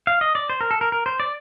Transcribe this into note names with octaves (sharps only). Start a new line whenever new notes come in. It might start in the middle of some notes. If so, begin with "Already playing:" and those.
F5
D#5
D5
C5
A#4
A4
A#4
A#4
C5
D5